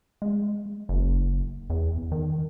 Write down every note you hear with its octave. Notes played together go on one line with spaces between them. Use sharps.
G#3
F#1
E2
D#3